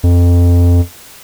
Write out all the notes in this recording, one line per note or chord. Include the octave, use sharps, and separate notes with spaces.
F2